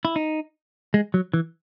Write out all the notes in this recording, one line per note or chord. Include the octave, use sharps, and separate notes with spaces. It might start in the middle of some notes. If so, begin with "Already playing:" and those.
E4
D#4
G#3
F#3
E3